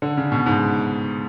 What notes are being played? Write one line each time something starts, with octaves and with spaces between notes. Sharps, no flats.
D3
C#3
B2
G#2